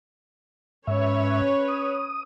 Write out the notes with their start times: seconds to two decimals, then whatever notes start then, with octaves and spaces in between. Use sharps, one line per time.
0.87 G#2 C#4 B4 C#5 E5
1.68 D#6